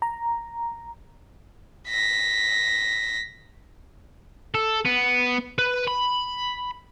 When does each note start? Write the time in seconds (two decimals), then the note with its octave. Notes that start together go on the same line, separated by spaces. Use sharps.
0.02 A#5
1.88 A#6 B6
4.55 A4
4.86 B3
5.59 B4
5.87 B5